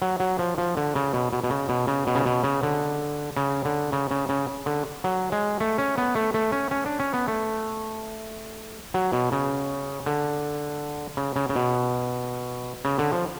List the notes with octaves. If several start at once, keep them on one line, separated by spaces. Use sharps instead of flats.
F#3
F#3
F3
F3
D3
C#3
B2
B2
B2
C#3
B2
C#3
B2
C#3
B2
C#3
D3
C#3
D3
C#3
C#3
C#3
D3
F#3
G#3
A3
C#4
B3
A3
A3
C#4
C#4
D4
C#4
B3
A3
F#3
B2
C#3
D3
C#3
C#3
C#3
B2
C#3
D3
F3